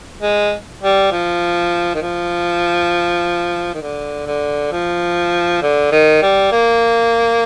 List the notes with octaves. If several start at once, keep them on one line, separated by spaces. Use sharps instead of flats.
G#3
G3
F3
D#3
F3
D#3
D3
D3
F3
D3
D#3
G3
A#3